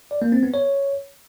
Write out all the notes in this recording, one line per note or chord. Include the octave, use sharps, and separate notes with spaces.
D5
A#3
C4
B3
C#5